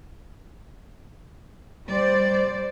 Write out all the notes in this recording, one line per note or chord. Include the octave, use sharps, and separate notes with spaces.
G3 C5 D5